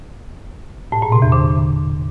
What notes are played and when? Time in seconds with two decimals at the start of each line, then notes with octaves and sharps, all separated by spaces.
0.92 A2
1.02 A#2
1.12 C3
1.22 E2
1.32 D3